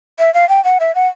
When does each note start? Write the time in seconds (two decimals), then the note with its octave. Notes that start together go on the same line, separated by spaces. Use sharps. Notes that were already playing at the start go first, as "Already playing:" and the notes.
0.19 E5
0.34 F5
0.49 G5
0.64 F#5
0.80 E5
0.95 F#5